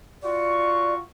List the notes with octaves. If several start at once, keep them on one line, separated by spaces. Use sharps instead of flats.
F4 F#4 D5 C#6